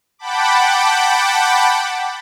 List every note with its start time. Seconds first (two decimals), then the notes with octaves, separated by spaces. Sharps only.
0.19 F#5 G5 A5 B5 D6